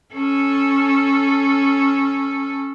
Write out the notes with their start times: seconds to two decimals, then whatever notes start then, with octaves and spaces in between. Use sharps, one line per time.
0.14 C#4 A4